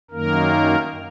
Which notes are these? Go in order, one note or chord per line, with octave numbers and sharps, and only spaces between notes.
F#2 D#3 A#3 A#4